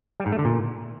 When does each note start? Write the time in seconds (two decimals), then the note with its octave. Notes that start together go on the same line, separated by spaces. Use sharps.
0.20 G3
0.26 G#2
0.32 A3
0.39 D3
0.45 A#2